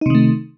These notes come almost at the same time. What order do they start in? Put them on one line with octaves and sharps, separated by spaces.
D#4 C3 D#3 A3